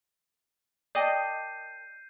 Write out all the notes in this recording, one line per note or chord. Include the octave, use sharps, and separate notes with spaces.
A#4 D5 D#5 G5 A5 G6 C7 D#7